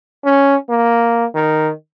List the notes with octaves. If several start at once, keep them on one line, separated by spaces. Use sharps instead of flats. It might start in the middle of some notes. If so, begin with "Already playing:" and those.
C#4
A#3
D#3